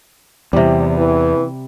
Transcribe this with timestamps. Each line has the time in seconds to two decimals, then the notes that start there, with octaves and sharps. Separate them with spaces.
0.53 E2 C3 G3
0.98 E3